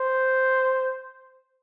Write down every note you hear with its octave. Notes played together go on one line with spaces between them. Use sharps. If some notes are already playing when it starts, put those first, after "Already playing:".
Already playing: C5